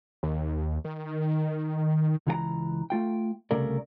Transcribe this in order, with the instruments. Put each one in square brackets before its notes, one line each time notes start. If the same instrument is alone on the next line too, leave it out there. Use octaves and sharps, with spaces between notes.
[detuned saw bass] D#2
D#3
[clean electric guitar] C#2 E3 F#4 A#5
A3 F4 G5
C2 C#3 A3 A#4 D5